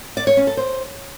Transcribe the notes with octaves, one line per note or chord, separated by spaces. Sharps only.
D5
C#5
C#4
A4
C5